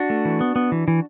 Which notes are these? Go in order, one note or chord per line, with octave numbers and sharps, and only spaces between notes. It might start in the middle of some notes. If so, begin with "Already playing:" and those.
Already playing: D4 F#4
A3
E3
B3
B3
E3
E3